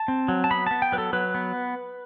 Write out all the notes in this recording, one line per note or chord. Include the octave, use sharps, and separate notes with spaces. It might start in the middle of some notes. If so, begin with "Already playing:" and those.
Already playing: A5
C4
F#3
A5
B3 B5
B3 A5
G5
F#3 B4
A4
F#3 B4
B3